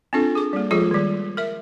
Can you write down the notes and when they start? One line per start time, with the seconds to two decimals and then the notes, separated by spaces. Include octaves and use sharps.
0.13 C4 D4 F4 A4
0.35 G#4 D6
0.53 G3 A#3
0.71 F3 G#3 F4 G#4 A4
0.91 D#3 G3
1.37 A#4 E5